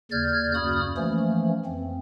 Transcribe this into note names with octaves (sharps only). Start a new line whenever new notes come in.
D#2 C#3 D5 F6 G6 G#6
F#2 A#3 F#4 B5 D#6 F6
E3 F3 A3 A#3 C#4
F2 C4